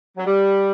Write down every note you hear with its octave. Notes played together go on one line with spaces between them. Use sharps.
F#3
G3